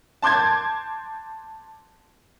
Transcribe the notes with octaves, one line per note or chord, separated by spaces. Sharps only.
A5 C6 D6 G6 G#6